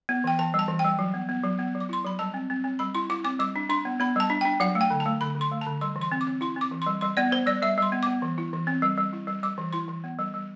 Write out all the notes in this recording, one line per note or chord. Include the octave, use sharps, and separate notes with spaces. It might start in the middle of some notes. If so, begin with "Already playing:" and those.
B3
E3 G5
E3 A5
G3
A5
E3
G3 G5
F#3
B3
B3
F#3
B3
F#3
D6
E4 C6
F#3 B5
G3 A5
C4
C4
C4
G3 B5
E4 C6
E4 D6
C4 D6
G3 D6
D4
D4 C6
B3
B3 B5
G3 A5
D4
D4 G5
F#3 F#5
A3
G5
D3
A5
A3
D3 B5
D3
C6
A3
A5
D3
G3 C6
E3
C6
C4
D6
C4
E4 C6
C4 D6
E3
G3 C6
G3 C6
B3 D5
B3 C5
G3 D5
G3 E5
G3 C6
B3
B3 D6
E3
E4
E3
C4
G3
G3
E4
G3
G3 D6
E3
E4 C6
E3
B3
G3
G3